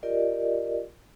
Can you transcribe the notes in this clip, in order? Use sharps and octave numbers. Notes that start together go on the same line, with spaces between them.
F4 G4 A#4 D5 D#5